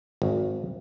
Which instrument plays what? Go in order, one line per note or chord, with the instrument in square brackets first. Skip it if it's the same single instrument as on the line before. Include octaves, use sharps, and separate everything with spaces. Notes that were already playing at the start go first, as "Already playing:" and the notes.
[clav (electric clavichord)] G#1